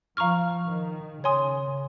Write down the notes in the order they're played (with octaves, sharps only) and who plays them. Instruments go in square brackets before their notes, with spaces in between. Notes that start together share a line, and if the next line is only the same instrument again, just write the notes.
[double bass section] F3 [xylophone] F5 A#5 C#6 F6
[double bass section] D#3
[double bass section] C#3 [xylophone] C#5 G#5 C6 D#6